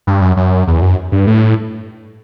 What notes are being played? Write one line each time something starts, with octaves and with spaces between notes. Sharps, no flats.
G2
F#2
F#2
E2
F#2
G2
A2